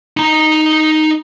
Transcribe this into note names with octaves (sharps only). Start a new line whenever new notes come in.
D#4 A#5